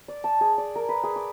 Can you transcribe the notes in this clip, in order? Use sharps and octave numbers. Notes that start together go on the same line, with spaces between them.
D5
A5
G#4
D5
A#4
B4
G#4
D6